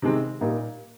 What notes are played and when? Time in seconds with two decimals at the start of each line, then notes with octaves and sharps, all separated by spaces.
0.02 C3 D#3 G#3 C4
0.41 A#2 G3 A#3 D#4